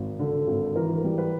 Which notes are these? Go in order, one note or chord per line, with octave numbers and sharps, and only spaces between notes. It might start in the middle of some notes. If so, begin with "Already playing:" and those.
Already playing: G#1
D3
G#1
E3 A#4
G3
B4